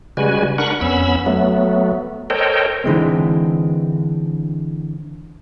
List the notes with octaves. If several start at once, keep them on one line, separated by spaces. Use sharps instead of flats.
C#3 G3 G#3 F#4 B4 G#5
D4 A#4 F#5 B5 C#6
F2 B3 C#4 B5 E6
F#3 A3 B3
A4 A#4 C5 C#5 D#5 G5
D3 E3 G#3 C4